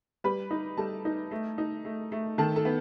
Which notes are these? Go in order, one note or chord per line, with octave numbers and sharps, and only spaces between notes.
G3 B4 B5
D#4
G3 A4 A5
D#4
A3
D#4
A3
A3
D#3 A4 A5
A4 A5
B3